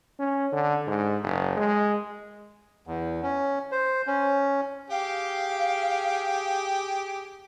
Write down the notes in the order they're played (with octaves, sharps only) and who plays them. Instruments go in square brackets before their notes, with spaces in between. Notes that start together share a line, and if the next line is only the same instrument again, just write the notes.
[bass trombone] C#4
D3
G#2
F#1
G#3
[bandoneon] E2
C#4
C5
C#4
[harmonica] G4 G#4 G5 [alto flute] F5